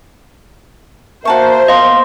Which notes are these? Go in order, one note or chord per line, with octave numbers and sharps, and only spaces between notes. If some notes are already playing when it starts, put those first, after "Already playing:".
A#3 F#4 A#4 C5 E5 A5 C#6
A#3 B3 D#5 F5 C6